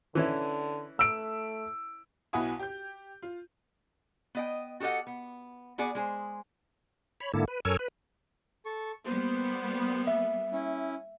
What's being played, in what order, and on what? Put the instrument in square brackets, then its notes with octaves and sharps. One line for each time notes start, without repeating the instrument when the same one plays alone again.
[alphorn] D3 [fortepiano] E3 C#4 E4
[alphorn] A3 [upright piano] E6 D7
[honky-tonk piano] B1 B2 E4 F#5 G#5 D#6
G4 G6
F4
[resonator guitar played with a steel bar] B3 D#5 G5
F#4 G4 A4 D#5 F#5
B3
B3 F#4 G#4 D5
G#3 G#4 C5
[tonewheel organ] C#5 B5
G#2 D3 A#3 E4 A4
B4
F#2 A4 A#4 C#5 G#5 E6
B4
[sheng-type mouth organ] A4 C#6
[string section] G3 A#3 B3 [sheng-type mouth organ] C5
[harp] E5
[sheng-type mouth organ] C#4 E4